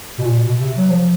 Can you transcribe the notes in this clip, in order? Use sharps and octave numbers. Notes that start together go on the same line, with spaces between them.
B2
A#2
B2
C3
F#3
F3